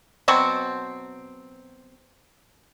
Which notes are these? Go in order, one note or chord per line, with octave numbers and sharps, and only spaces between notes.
B2 F#3 C4 C#6